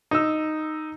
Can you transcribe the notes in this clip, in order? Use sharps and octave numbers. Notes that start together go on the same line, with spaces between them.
D#4 E6